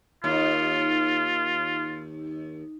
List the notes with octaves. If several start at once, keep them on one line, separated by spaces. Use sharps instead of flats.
D#2 F4